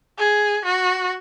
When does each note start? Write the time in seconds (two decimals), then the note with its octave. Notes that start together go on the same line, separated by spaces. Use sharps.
0.18 G#4
0.65 F#4